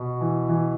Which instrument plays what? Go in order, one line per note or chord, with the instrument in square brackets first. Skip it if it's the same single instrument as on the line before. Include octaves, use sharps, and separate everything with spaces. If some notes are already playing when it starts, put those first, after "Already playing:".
Already playing: [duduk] B2
[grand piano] E3
E3